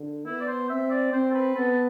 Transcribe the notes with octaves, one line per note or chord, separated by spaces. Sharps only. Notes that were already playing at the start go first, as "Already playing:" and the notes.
Already playing: D3
B3 E4
D5
C5
C4 E5
D5
C4 C5
A4
B4
B3 A4